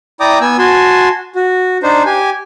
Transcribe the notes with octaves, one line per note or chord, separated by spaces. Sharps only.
E4 D5 G5 A#5 D6 D#6
B3 G#5 E6
F#4 G#5 A5 C6
F#4
D4 D#4 C5
G4 G#5